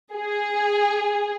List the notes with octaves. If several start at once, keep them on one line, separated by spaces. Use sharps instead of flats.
G#4